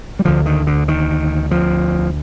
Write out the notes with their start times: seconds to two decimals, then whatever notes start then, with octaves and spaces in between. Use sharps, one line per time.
0.19 G3
0.25 D2 D3 F3
0.46 D#3
0.67 D3
0.88 D#3
1.51 F3